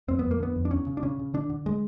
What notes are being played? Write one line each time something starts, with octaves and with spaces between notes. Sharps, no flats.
F2 C4
B3
F2
A#3
D3 B3
F2
D4
E2 C#4
C#3
D4
C#3 C#4
C#3
D3 D4
D3
G#3